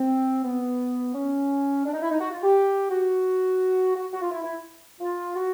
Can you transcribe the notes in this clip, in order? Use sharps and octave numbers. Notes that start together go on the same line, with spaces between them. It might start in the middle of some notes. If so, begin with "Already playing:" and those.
Already playing: C4
B3
C#4
D4
D#4
E4
D#4
F#4
F4
G4
F#4
F#4
F#4
F4
E4
E4
F4
F#4